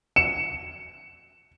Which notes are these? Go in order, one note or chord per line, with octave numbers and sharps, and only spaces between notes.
C#7 E7